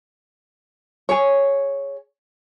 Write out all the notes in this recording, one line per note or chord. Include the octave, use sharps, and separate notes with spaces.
G#4 C#5